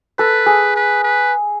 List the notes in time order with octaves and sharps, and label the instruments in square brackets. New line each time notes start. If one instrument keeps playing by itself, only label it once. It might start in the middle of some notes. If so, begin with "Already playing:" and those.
[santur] A4 [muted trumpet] B4
[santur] G#4
[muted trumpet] B4
B4